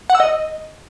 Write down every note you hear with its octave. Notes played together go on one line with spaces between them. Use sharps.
F#5
E6
D#5